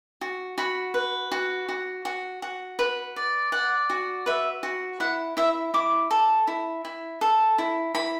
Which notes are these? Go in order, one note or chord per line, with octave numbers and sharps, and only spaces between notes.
F#4
F#4 B5
B4
F#4
F#4
F#4
F#4
B4
D5
D5 F#5
F#4
B4 E5
F#4
E4 F#5
E4 E5
E4 D6
A4
E4
E4
A4
E4
E4 B5